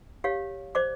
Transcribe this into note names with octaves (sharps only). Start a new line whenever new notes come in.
G4 C#5 F5
C5 D5 D6